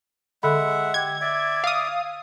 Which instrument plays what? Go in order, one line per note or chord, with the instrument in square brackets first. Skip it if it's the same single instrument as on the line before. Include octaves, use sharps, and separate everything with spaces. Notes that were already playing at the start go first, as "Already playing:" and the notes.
[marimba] D3 A4 B5 [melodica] G#3 E5 F#5
[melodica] G4 [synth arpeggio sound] G#6
[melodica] D5 E5 D6
[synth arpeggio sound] F5 D#6